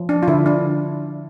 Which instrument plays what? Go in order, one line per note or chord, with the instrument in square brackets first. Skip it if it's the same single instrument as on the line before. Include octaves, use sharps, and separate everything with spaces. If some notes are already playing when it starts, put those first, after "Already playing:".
Already playing: [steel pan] F3
D4
F4
D3 E4
D4